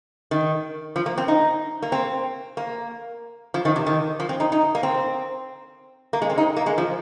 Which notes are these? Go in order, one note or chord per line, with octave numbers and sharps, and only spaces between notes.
D#3
F3
A#3
C4
D#4
A#3
C4
A#3
F3
D#3
C3
D#3
F3
C4
D#4
D#4
A#3
C4
A#3
G#3
C4
D#4
A#3
G#3
F3